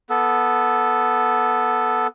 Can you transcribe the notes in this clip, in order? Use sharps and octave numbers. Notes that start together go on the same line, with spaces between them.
B3 A4